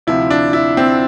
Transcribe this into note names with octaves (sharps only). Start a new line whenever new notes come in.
D2 C3 F3 E4
D4
E4
C4